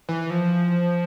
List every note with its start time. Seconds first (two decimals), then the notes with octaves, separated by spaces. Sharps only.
0.09 E3
0.30 F3